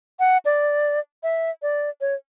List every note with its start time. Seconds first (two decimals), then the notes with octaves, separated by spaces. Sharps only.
0.19 F#5
0.45 D5
1.23 E5
1.62 D5
2.01 C#5